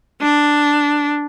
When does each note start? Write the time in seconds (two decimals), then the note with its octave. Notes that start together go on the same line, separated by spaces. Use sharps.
0.22 D4